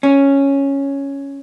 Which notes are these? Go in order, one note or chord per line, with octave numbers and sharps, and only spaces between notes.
C#4